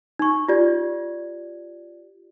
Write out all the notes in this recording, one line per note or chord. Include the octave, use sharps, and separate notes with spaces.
D#4 C#6
F4 G4 D5 G#6